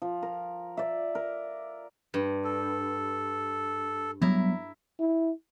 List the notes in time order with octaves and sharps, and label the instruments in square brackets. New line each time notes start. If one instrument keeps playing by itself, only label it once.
[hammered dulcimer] F3
A#4
D5 E5
A#4
[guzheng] G2
[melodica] A4
[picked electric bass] F#3 G3 B3 [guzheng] E4 A#5
[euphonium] E4